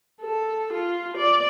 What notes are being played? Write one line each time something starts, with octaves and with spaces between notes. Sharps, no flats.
A4
F4
D5